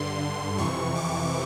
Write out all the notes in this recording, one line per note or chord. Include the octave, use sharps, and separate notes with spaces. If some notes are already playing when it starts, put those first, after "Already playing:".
Already playing: G2 D3 C6
F2 C3 E3 C#6
D6